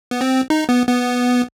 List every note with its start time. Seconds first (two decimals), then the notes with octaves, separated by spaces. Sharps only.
0.11 B3
0.21 C4
0.50 D#4
0.69 B3
0.88 B3